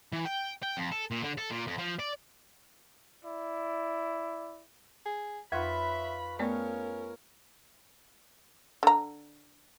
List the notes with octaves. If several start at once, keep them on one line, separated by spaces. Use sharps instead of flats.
E3
G5
G5
F2
A4
A#2
D3
A4
A#2
F2
F3
D5
E4 D5
G#4
F2 F4 B4 C#5 E5 B5
A3 B3 C#4 G#4 A#4 C#5 D5 G#5
D3 A#5